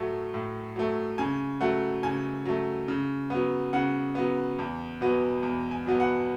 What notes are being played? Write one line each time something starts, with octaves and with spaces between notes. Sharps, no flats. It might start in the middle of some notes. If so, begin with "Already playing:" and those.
Already playing: A2 F#3 A3
A2
F#3 A3
C#3 G#5
F#3 A3 F#5
C#3 G#5
F#3 A3
C#3
F#3 B3
C#3 F#5
F#3 B3
E2
B2 F#3 B3
E2
G#5
B2 F#3 B3
F#5